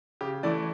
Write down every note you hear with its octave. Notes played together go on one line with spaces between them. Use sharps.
C#3 G4
E3 A3 E4 D5